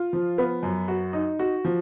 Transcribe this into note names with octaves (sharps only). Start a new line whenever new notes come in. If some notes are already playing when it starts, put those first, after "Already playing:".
Already playing: F4
F3
B3
F#2
F#4
D#4
F#4
F3